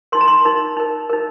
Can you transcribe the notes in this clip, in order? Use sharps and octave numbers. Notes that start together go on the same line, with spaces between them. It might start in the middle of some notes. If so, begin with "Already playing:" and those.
D#4 A#4 C6
A#5
C6
D#4 A#4
D#4 A#4
D#4 A#4